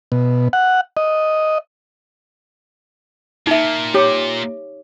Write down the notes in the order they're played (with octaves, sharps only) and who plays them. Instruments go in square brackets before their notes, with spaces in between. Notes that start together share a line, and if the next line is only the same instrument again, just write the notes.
[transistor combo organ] B2
F#5
D#5
[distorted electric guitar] A#2 [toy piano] D#4 E5
[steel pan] G4 [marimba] C#5